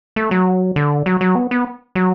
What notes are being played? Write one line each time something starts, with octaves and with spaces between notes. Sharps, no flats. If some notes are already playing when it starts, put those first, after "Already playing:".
A3
F#3
D3
F#3
F#3
B3
B3
F#3